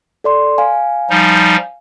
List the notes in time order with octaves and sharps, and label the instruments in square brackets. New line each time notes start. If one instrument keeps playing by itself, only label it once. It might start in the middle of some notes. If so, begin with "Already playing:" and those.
[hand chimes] A4 D5 C6
F5 G#5
[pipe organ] F3 G3 D#4